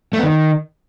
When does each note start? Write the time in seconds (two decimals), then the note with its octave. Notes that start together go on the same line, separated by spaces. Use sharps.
0.13 A3
0.18 B3
0.23 D#3